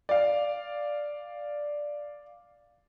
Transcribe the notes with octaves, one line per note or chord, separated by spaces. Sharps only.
D5 F5